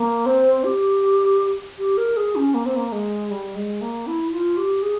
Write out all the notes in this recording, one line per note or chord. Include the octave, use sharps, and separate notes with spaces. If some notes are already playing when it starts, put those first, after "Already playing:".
Already playing: A#3
C4
G4
G4
A#4
G#4
C#4
A#3
C4
A#3
G#3
G3
G#3
A#3
E4
F4
G4
G#4